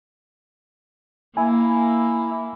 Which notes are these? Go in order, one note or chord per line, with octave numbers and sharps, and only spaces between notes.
A#3 E4 G#5